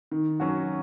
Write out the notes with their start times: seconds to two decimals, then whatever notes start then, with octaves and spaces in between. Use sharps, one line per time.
0.11 D#3
0.40 F#3 C#4 F#4